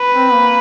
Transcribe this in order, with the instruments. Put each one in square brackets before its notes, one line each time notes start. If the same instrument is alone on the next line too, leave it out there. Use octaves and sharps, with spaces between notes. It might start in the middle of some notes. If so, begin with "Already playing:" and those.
Already playing: [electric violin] B4
[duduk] C4
A#3